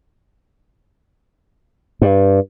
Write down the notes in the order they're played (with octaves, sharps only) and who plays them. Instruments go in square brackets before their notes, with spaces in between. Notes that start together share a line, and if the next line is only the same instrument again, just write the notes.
[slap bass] G2